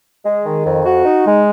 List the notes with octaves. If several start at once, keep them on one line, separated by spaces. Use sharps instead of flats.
G#3
D#3
F2
F#4
D#4
G#3